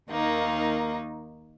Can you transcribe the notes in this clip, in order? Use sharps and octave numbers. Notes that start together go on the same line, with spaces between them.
D#2 D#3 A#3 D#4